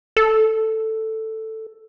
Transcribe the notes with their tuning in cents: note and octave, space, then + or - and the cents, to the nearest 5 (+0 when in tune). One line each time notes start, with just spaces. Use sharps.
A4 +5